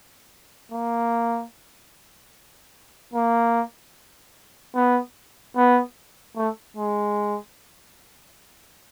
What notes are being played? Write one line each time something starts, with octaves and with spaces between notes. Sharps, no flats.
A#3
A#3
B3
B3
A3
G#3